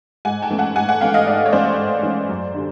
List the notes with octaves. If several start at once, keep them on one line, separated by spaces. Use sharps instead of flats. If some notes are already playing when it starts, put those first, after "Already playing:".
G#2 F#5 G#5
G5 A5
E3 A3 C#4
F#5 G#5
G#2 F#5 G#5
F#5 G#5
E3 A3 C#4 F5 G5
D#5 F5
G#2 D5 E5
C#5
E3 A3 C#4 C5 D5
G#2
E3 A3 C#4
F#2
D3 G3